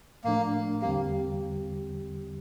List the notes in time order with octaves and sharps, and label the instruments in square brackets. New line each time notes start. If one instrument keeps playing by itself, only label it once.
[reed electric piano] A2 F3 A3 D4 [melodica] A#3
[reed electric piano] E2 D3 G3 C4 G4 [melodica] A#3